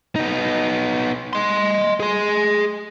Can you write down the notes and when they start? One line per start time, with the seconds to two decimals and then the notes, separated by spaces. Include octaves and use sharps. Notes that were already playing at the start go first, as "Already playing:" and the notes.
0.16 B3 D#4
1.33 D#5 C6
2.00 G#4 C6